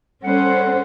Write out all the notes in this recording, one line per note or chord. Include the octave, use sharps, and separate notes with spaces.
G3 C#4 A4 C5 F#5